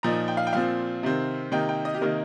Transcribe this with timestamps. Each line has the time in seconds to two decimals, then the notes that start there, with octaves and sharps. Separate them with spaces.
0.03 A#2 F3 D#4 A#5
0.28 G5
0.37 F5
0.47 G5
0.53 A#2 F3 C4 F5
1.03 C3 D#3 C4
1.52 C3 D#3 A#3 D#4 G5
1.69 G5
1.85 D#5
1.94 G4
2.01 C3 D#3 A#3 D#4 A#4